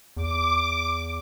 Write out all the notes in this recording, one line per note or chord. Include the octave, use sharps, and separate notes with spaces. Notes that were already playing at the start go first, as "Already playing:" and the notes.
E2 D6